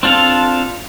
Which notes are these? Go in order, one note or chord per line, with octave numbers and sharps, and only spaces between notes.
C4 D4 F4 A4 F5